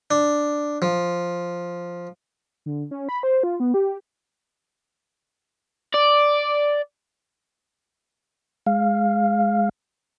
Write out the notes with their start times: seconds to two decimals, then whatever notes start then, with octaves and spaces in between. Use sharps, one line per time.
0.11 D4
0.82 F3
2.66 D3
2.91 C#4
3.09 B5
3.23 C5
3.43 F4
3.60 B3
3.74 G4
5.94 D5
8.67 G#3 F5